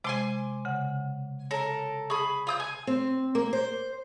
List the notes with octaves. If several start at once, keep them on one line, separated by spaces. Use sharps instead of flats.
C3 G#3 G#5 C6 D6
C#3 F#5
A4 A#4 C#5
G#4 B5 C#6
F4 D#6 G6
G#5
C4
A#3
C5